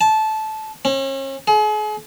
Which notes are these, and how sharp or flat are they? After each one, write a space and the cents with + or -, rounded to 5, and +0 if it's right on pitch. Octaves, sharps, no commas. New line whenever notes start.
A5 -15
C#4 -40
G#4 +40